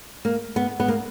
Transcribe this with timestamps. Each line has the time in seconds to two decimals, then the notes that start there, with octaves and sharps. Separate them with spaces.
0.25 A#3
0.56 B3
0.80 B3
0.88 A#3